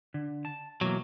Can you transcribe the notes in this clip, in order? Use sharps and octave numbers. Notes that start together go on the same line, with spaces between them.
D3
A5
B2 E3 F#3 A#3